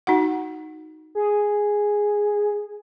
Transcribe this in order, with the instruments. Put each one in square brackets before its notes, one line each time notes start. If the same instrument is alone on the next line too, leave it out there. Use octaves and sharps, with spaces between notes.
[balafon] D#4 F#4 F#5
[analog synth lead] G#4